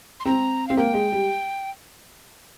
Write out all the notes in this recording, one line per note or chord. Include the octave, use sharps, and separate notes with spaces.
C6
C4 A#5
C4 F5
A#3 G5
G#3
G3